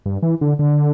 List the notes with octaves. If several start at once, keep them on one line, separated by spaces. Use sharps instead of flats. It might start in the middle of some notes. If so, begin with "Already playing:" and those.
G2
E3
D3
D3